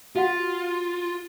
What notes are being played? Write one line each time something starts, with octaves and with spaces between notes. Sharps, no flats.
F4 F#4 F5 F#5